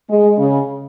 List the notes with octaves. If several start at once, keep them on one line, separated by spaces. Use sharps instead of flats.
G#3
C#3